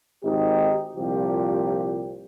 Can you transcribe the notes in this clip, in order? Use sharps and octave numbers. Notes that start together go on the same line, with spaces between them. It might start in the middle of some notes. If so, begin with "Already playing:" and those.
G#1 D#4 G4
C2 A#2 F3 G4